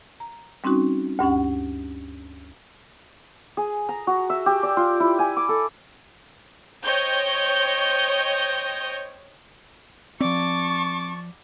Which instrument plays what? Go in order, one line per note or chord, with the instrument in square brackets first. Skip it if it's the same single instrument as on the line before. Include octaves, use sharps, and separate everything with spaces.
[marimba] A#5
G3 C4 C#4 D#4 F#4
D2 G2 C#4 F#5
[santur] G#4
A#5
F#4
E5
G4
D5
F4
E4
G#5
D6
A4
[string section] C5 C#5 D#5 G5 G6
[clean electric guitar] F3 D5 [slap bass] C4 [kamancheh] A5 C#6 [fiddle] D6